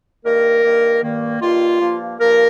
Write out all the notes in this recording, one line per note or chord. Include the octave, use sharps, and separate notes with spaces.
G2 D#3 A#3 A#4
G2 D#3 A#3
G2 D#3 A#3
G2 D#3 A#3 F4
G2 F3 A#3
G2 F3 A#3 A#4